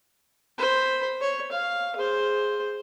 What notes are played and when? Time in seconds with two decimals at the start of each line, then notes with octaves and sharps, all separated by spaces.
0.58 C5 B5
1.21 C#5
1.52 F5
1.96 G#4 C5